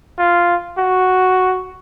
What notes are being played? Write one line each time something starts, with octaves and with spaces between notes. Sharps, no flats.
F4
F#4